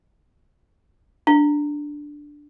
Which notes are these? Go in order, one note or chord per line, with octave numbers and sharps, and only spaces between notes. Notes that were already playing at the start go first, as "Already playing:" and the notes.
D4